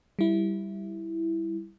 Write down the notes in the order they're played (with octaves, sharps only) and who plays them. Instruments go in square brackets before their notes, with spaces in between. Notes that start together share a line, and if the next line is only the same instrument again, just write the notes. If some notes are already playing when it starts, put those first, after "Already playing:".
[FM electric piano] G3 E4